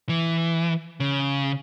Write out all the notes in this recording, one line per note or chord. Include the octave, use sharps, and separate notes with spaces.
E3
C#3